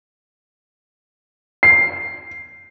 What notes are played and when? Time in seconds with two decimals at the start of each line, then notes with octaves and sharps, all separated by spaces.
1.63 C7